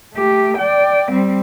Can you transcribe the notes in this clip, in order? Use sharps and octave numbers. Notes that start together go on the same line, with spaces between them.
A3 G4
D5 G5
G3 C4